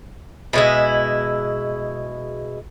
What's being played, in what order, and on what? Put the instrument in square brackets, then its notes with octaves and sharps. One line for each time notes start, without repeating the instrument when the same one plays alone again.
[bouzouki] B2 G#3 E4